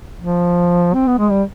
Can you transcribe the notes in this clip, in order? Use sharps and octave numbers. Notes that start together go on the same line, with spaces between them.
F3
C4
B3
G#3
G3